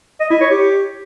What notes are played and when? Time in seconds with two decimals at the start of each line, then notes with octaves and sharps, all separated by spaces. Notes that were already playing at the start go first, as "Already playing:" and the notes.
0.20 D#5
0.30 E4
0.41 C#5
0.51 G4